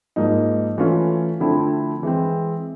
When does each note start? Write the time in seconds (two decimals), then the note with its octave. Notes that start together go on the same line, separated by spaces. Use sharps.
0.16 G#2 F3 A#3 D#4
0.78 E3 A3 C#4 F4
1.40 D3 F3 A3 C4 E4
2.03 E3 G#3 C4